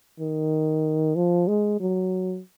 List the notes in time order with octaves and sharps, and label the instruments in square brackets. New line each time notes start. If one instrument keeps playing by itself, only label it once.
[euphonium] D#3
F3
G#3
F#3